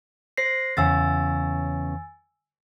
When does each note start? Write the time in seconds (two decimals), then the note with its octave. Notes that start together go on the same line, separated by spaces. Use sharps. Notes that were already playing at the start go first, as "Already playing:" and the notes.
0.37 C5 A#6 C7
0.77 E2 C#3 C#4 G#5 E6 A6